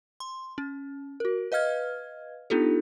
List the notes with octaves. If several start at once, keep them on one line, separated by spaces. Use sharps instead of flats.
C6
C#4
F#4 A#4
B4 D#5 F5 F6 G#6
B3 D4 D#4 F4 G4 A4